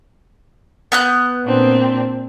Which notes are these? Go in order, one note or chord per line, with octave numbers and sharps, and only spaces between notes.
B3 F#6 G6
A#2 C4 D4